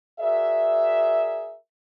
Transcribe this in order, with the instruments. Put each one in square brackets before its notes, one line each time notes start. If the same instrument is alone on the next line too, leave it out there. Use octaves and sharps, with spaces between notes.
[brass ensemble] F#4 G#4 A#4 D5 E5